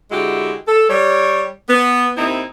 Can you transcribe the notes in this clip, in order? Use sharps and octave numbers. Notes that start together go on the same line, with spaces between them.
D3 G#3 E4 F#4 G4
A4
G3 C#5
B3
D#2 C4 D#4 E4